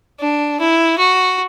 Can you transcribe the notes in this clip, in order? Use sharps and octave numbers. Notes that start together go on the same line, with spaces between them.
D4
E4
F#4